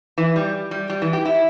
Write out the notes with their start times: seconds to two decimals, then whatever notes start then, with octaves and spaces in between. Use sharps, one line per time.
0.18 E3
0.36 G3
0.71 G3
0.90 G3
1.02 E3
1.13 G4
1.25 E4